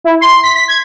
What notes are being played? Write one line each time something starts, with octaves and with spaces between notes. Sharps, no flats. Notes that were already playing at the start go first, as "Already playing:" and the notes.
E4
C6
B6
B6
G#6